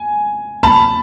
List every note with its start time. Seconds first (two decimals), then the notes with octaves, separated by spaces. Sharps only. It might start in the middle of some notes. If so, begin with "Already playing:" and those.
Already playing: G#5
0.63 A5 B5